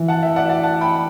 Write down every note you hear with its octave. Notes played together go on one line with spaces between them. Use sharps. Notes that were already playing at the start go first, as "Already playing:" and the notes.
Already playing: E3
F#5 A5
E5 G5
D5 F#5
E5
D5 F#5
F#5 A5
G5 B5